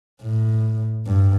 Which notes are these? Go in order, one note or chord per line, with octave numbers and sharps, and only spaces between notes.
A2
G2